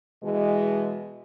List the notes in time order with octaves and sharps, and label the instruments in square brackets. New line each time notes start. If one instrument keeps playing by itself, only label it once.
[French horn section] B2 E3 G#3